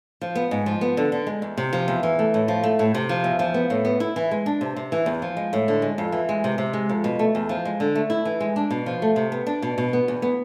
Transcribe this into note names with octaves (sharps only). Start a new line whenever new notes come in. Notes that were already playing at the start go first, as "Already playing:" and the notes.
F3
B3
G#2
F3
B3
D3
D3
G#3
E2
C3
F3
E2
E3
A3
A2
F3
A3
A2
C3
F3
E2
F3
B3
A2
B3
E4
E3
G#3
D4
C3
C3
E3
E2
F3
G#3
A2
D3
G#3
F2
E3
G#3
C3
C3
G#3
F2
B2
A3
E2
F3
G#3
D3
A3
E4
E3
G#3
D4
B2
F3
A3
C3
B3
D4
B2
B2
B3
E2
B3